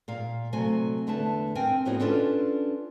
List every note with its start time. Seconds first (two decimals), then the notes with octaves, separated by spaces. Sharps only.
0.08 A#2 F5
0.53 C3 F#3 A3 G#5
1.07 E2 D3 A3 B4 E5 A5
1.55 C4 A#4 G5 G#5
1.85 A2 F3 B3 F#4 C#5 D#5
2.00 C#4 D4 F4 A4 B4